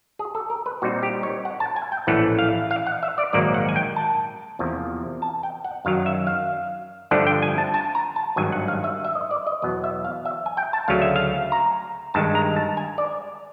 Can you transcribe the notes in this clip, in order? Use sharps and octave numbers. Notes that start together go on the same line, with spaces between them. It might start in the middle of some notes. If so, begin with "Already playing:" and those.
G#4
A4
A#4
B4
A#2 G3 C4 D#4 F#4
G4
C#5
F#5
A5
G#5
G5
A#1 A2 E3 A3 C#4 F#5
F5
F5
F#5
E5
D5
A#1 G#2 D#3 F#3 A#3 D5
F#5
G#5
G5
A5
E2 C3 F3 A#3
A5
G5
F#5
F#2 D#3 F#3 F5
E5
F5
G2 D3 F3 A3 D4 F#5
G5
G#5
A5
A5
A#5
A5
G#1 G2 D#3 F#3 G#5
F#5
F5
E5
E5
D#5
D5
D#5
E2 B2 F#3 B3 D#5
E5
F5
E5
G#5
G5
A5
D2 C#3 F#3 A3 C#4 F5
E5
F5
A#5
G2 D#3 G#3 A5
A#5
A5
G#5
D5